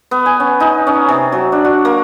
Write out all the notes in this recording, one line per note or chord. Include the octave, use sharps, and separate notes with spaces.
B3
G#5
C#4
D#4
C#4
C3
F#3
D4
F#4
A#3